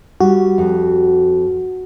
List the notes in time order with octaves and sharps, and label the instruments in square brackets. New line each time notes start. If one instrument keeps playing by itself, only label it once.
[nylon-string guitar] G3 [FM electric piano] F#4
[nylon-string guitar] F2